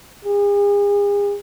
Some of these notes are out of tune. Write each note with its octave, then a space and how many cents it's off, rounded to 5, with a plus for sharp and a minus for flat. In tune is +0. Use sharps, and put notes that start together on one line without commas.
G#4 -40